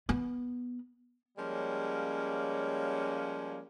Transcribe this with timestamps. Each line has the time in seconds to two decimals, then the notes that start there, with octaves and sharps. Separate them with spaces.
0.09 B3
1.38 F3 G3 G#3 A#3 C#4